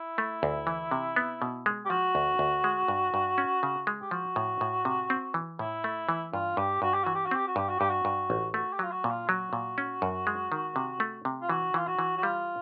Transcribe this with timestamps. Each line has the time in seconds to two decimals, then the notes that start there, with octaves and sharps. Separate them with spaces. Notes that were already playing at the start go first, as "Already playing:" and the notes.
Already playing: E4
0.18 A3
0.43 D2
0.67 E3
0.91 C3
1.16 B3
1.42 B2
1.66 G#3
1.85 G4
1.90 F3 F#4
2.15 D2
2.39 D2
2.64 G#3
2.88 G2
3.14 G2
3.38 C#4
3.63 C#3
3.87 G#3
4.01 G4
4.11 F3 F#4
4.36 A2
4.61 A2
4.85 C3
5.10 C4
5.34 E3
5.59 A2 E4
5.84 A3
6.09 E3
6.33 G2 F4
6.57 G2 G4
6.82 G2 F#4
6.94 G4
7.04 E3 F#4
7.14 G4
7.25 F#4
7.31 C4 G4
7.47 F#4
7.56 G2 G4
7.69 F#4
7.79 G2 G4
7.90 F#4
8.05 G2
8.30 A1
8.54 A3 F#4
8.73 G4
8.79 F#3 F4
8.91 F#4
9.04 A#2
9.10 F4
9.28 F#3 F#4
9.53 A#2
9.78 C#4
10.02 F#2
10.27 G#3
10.52 D#3
10.76 C3
11.00 A3
11.25 C3
11.42 F4
11.49 E3 F#4
11.74 E3 F4
11.87 F#4
11.99 E3
12.17 F#4
12.23 G3 F4